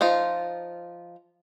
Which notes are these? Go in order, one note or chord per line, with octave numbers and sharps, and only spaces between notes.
F3 D#4 F4